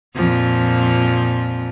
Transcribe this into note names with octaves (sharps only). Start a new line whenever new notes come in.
F2 A#2 F3